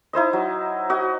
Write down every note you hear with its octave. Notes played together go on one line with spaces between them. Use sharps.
D#4 E4 C5 D#5
F#3
F#4 D#5